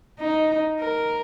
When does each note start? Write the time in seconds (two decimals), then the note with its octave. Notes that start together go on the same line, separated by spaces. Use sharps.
0.19 D#4
0.80 A#4